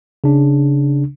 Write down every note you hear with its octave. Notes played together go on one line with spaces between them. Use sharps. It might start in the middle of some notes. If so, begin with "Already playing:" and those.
C#3 D4